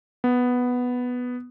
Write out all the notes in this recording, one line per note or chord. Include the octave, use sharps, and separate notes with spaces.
B3